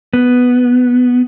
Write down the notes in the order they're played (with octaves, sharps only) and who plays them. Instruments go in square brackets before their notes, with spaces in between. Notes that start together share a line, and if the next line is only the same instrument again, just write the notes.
[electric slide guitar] B3